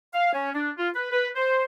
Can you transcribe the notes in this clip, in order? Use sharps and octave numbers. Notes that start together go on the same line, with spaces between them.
F5
C#4
D4
F4
B4
B4
C5